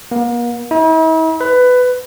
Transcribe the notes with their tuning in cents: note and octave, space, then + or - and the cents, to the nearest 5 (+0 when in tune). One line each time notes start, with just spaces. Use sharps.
A#3 +40
E4 -45
B4 +15